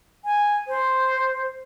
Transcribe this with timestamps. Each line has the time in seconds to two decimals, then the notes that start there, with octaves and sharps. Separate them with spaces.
0.25 G#5
0.68 C5